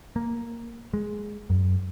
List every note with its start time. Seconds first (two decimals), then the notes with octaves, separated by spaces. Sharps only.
0.16 A#3
0.94 G#3
1.50 F#2